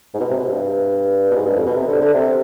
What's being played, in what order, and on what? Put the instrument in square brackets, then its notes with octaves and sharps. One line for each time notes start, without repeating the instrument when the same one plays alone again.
[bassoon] G#2
B2
C3
B2
G2
B2
G#2
G2
F2
B2
C3
D3
D3
C3